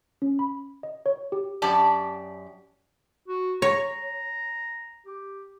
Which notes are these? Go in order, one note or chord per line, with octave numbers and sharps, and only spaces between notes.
C#4
B5
D#5
C#5
G4
F#2 G4 D5 A5
F#4
C#5 A#5
G4